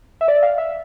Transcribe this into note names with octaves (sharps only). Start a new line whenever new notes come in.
E5
D5
F5
E5